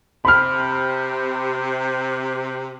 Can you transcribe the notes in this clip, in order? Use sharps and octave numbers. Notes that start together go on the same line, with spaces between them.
C3 B5 F6